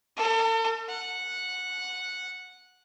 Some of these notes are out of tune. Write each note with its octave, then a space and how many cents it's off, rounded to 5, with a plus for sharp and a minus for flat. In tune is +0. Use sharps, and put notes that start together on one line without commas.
A4 +40
F#5 -10